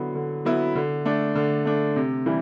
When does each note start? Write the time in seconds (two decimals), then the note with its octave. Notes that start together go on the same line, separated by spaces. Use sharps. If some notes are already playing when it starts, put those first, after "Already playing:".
Already playing: D3 F#3 B3 E4
0.15 D3
0.45 F#3 B3 E4
0.75 D3
1.05 A3 D4
1.35 D3
1.65 A3 D4
1.96 C3
2.26 E3 G3 E4